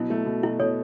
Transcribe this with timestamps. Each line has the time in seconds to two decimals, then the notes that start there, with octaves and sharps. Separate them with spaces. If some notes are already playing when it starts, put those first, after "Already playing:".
Already playing: B2 F#3 E4
0.10 A3
0.26 B2
0.43 B2 E4
0.59 B2 A4 C#5